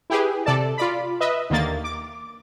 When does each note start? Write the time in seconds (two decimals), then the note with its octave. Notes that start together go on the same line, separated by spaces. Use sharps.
0.10 E4 G4 G#4 B4
0.46 C3 A4 D5 A5
0.78 F4 D5 B5
1.20 B4 D#5 E5
1.50 D#2 D3 D#3 A#3 A6
1.84 D6